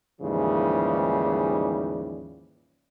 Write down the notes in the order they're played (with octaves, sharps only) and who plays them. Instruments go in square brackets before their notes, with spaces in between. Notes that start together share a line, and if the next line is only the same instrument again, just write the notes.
[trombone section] D#2 G#2 C#3 E3 F3 G3